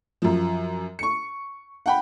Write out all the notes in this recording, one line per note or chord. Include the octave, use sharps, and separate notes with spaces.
F#2 F3
C#6 C#7
F#5 G5 B5